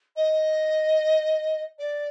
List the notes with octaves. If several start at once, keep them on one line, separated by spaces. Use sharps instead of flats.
D#5
D5